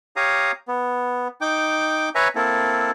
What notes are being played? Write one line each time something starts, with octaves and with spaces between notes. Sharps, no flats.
G4 C#5 F5 A#5 D#6
B3
D#4 G5 D6
B4 C#5 E5 G#5 A#5
A#3 C4 E4 A4